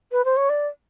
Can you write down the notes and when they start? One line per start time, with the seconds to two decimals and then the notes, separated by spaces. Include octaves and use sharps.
0.12 B4
0.25 C5
0.37 C#5
0.49 D5